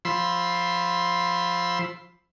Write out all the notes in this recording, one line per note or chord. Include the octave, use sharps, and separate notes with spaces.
F3 B5 C6 E6